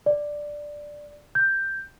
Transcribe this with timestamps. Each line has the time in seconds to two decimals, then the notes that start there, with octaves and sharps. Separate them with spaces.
0.06 D5
1.35 G6